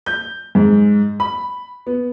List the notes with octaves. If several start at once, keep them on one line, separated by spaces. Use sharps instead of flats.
G6
G#2
B5
B3